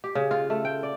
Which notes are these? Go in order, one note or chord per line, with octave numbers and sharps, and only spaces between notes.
G4
C#3
F4
A3
G5
D5